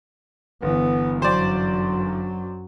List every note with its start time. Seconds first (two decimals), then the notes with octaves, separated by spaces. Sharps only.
0.62 G1 E3 B3
1.22 F#2 F#3 C5 D5